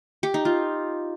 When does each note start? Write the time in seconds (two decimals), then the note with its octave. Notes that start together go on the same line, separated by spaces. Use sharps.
0.23 G4
0.34 D#4
0.45 F4